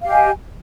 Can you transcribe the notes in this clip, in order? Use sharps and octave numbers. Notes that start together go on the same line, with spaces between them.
G4 D#5 F5 G#5